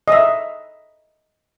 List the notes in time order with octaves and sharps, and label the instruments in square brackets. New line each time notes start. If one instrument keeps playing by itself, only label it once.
[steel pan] D#5 E5